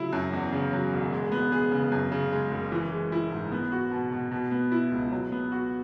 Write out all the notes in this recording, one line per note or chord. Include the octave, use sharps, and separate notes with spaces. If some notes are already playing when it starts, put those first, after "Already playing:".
Already playing: C#3 F#3 E4
F#2
E2
C#3
F#3
E1
G#3
B3
G#4
C#3
F#2
C#3
G#3
F#1
E3
G#3
E4
G#2
B3
F#4
B2
B2
B2
B3
E4
C#2
F#3
B3
F#4